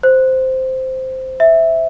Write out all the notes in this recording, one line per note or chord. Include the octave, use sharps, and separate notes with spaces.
C5
E5